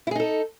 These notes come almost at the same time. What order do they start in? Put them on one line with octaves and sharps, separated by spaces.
E4 G#4 D#4 A4